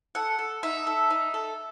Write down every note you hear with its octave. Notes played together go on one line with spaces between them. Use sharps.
A4 F#5
A4
D#4 E5
A4
D#4
A4